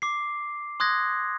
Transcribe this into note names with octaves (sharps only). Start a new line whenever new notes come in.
D6 C7
C6 D#6 F#6 G#6 A#6